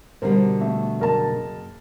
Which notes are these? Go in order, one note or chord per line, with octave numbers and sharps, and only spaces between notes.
B2 D3 G3 A#4 C5
A3
F#1 A#4 A5